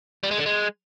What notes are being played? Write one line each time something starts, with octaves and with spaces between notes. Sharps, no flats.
G3
G#3
D3
G#3